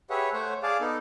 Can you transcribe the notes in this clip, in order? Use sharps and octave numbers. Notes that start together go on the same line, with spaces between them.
G4 G#4 B4 C#5 E5 F#5
A3 C5 C#5 F#5
G#4 D5 F5 A5 D6
B3 D#4 A4